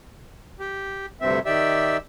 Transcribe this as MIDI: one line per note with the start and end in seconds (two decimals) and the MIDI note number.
0.60 1.06 67
1.21 1.39 38
1.21 1.39 43
1.21 1.39 48
1.21 1.39 60
1.21 1.39 76
1.46 1.97 51
1.46 1.97 67
1.46 1.97 74
1.46 1.97 76
1.46 1.97 88